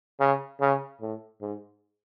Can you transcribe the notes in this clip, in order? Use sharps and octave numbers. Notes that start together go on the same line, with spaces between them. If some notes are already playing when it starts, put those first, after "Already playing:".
C#3
C#3
A2
G#2